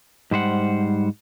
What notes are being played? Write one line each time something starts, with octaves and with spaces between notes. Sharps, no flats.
G#2 G3 C5 F#5